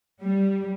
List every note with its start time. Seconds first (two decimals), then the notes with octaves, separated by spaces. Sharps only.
0.22 G3